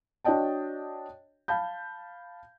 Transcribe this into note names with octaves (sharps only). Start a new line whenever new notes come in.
D4 F#4 C#5 D#5 G5 A5
F5 A5 B5 G6